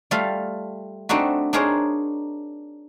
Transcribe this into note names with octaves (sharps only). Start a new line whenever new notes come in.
G3 A3 F4 A4 F5
A3 C4 D4 D#4 F#4
D4 D#4 G#4 A#4 C5 C#5